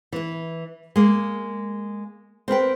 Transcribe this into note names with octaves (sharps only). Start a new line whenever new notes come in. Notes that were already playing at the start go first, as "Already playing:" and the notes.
E3 E4
G#3 A#3
C4 A#4 B4 G5